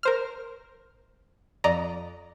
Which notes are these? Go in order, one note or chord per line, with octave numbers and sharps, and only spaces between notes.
A#4 C5 F6
F2 D5 D#5 A#5